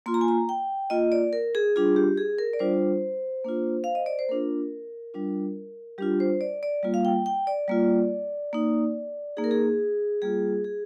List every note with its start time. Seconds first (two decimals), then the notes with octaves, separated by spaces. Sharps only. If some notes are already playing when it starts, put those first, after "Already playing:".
0.06 A#3 F4 C6
0.14 A#5
0.21 G#5
0.28 A#5
0.49 G5
0.90 A#3 F4 D#5
1.12 D5
1.33 A#4
1.55 G#4
1.76 G3 D4 F4 G#4
1.96 G4
2.17 G#4
2.38 A#4
2.53 D5
2.59 G3 D4 F4 C5
3.45 A#3 D4 F4
3.84 F5
3.95 D#5
4.06 D5
4.19 C5
4.29 A#3 D4 F4 A#4
5.14 G3 D4 F4
5.98 G3 D4 F4 G4
6.20 C5
6.41 D5
6.63 D5
6.83 G3 A#3 F4
6.94 F5
7.05 G5
7.26 G5
7.47 D5
7.68 G3 A#3 F4
8.53 A#3 D#4
9.37 A#3 D#4 G#4
9.44 A#4
9.51 G#4
10.22 G3 A#3 F4 G#4
10.64 G#4